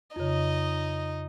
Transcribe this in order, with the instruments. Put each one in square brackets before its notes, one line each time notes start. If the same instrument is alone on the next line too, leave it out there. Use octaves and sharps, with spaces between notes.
[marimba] F2 C#3 [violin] D#4 D#5